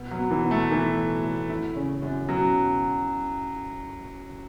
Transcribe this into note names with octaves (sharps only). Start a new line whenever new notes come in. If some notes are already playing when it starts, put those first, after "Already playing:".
Already playing: B2
F#3
B3
E3
B2
A3
A2 E3
F#3
A2
E4
C#3
F#2
B2 F#3